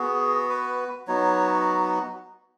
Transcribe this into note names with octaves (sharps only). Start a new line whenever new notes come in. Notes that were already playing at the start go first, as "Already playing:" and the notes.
Already playing: B3 F#4 G#4
B4
F#3 B3 D#4 F#4 C#5